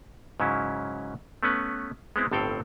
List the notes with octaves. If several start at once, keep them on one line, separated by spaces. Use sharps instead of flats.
G#2 C#3 F#3 C#4 E4
A3 B3 C#4 B4
G#3 B3 C4 E4
G1 A2 C4 A4 F5 G5